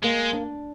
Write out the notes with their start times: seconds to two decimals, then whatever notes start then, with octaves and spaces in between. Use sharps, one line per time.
0.03 G#3 A#3
0.33 D4